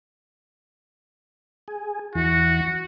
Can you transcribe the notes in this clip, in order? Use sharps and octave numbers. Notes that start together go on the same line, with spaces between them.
G#4
E2 E3 F#4